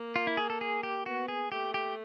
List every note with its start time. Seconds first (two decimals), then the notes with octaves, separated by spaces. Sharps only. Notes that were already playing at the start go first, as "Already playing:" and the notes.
Already playing: A#3
0.16 F4
0.27 E4
0.37 G#4
0.50 A4
0.61 G#4
0.83 G4
1.06 B3 F#4
1.28 G#4
1.51 A3 G4
1.74 G4